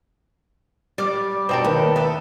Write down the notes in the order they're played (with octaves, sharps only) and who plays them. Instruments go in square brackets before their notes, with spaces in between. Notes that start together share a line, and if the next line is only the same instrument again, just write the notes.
[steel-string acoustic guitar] G3 [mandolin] D5 D6 F6
[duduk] B2 [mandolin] D#4 A4 A#4 [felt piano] C5 D5 G5
[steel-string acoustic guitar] D#2 [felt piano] D#3 A#3 [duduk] B4
[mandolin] D#4 A4 [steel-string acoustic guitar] E5